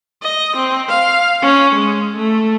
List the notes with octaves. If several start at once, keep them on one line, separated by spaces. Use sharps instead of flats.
D#5
C4
F5
C#4
G#3
A3